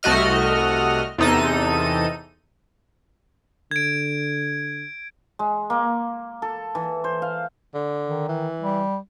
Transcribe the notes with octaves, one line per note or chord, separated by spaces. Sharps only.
C2 A3 F#4 D#5 F6
E2 C3 D#4 A4 D#7
D3 G#6 D7
G#3
A#3
A4
E3
C5
F5
D3
D#3
E3
G3